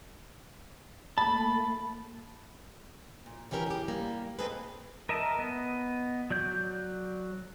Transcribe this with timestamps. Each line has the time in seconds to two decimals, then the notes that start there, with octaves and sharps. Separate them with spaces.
1.18 A3 A#3 A5 B5
3.26 A#2
3.51 D#3 E3 C#4 G4 A#4
3.66 G4 G#4
3.88 G3 A#3
4.39 C4 D#4 G#4 A4 B4
5.09 A#4 D#5 E5 A5
5.39 B3 D#5
6.30 F#3 D5 G6